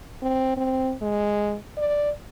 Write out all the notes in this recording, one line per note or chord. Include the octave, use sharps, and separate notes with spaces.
C4
C4
G#3
D5